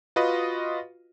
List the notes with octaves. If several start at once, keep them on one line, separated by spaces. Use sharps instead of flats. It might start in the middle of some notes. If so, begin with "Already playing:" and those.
F4 F#4 B4 D#5